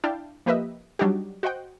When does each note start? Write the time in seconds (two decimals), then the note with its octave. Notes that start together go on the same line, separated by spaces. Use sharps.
0.04 D4 E4 F5 G5 A5
0.46 F3 A#3 G4 B4 D#5 E5
0.99 F#3 G3 D4 D#4 F#4 G4
1.43 F#4 C5 D#5 F#5 G5